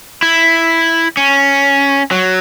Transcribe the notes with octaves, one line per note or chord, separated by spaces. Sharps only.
E4
C#4
F#3